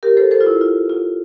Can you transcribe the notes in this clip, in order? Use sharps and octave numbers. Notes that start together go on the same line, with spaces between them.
G4 A#4
A4 C5
A4 C5
F4
E4
F4
F4